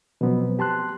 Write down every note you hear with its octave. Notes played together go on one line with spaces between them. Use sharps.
B2 F3 F#3 B3 C4
G4 A5 C6 F#6